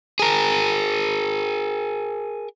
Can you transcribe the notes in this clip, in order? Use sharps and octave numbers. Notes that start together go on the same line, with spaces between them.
G#4 A#4